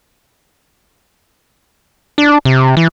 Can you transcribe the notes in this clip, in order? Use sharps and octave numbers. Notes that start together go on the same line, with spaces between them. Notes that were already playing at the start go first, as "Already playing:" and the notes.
D4
C3
E3